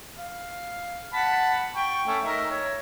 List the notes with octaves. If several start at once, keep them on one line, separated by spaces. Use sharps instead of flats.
F5
F#5 A5 B5
G5 C#6
A3 C#4
D#4 A#4 E5
C#5